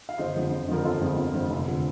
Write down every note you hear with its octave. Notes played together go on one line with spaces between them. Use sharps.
F5
G1 C5 D#5
F2 D3 F3
G1
F2 D3 F3 A#4
G1 F4 A4
F2 D3 F3
G1
F2 D3 F3
F1
D3 F3